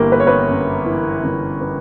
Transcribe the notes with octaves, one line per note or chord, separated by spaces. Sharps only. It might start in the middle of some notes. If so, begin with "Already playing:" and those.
Already playing: G1 E3 A#3 G4 A#4
B3 B4
C#5
B3 B4
F#2
E3
G1
B3